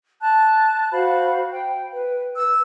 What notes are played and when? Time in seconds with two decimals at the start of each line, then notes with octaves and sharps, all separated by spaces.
0.22 A5 F#6
0.92 F#4 C5 F5 B5
1.51 G5
1.93 B4
2.35 B4 E6